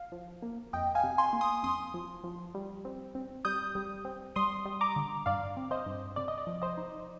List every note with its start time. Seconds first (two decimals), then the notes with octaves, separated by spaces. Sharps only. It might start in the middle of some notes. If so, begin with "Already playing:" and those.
Already playing: F5
0.12 F3
0.42 A#3
0.73 F2 D#5 G5
0.95 F5 G#5
1.03 C3
1.18 G#5 C6
1.33 A#3
1.41 C6 D#6
1.63 F2 C6 D#6
1.94 F3
2.24 F3
2.55 G3
2.85 C4
3.15 C4
3.45 G3 D#6 G6
3.75 G3
4.05 C4
4.36 G3 C6 D#6
4.65 G3
4.81 A#5 D6
4.96 D3
5.26 G2 D5 F5
5.57 C4
5.71 C5 D#5
5.86 G2
6.16 C3 D5
6.28 D#5
6.38 D5
6.47 F3
6.62 C5 D#5
6.77 D#4